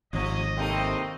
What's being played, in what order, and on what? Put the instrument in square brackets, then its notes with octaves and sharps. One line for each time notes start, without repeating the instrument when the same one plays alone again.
[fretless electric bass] G#1 [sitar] B2 F3 [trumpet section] D#5
[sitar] A2 D#4 A4 [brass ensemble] C3 A#3 C4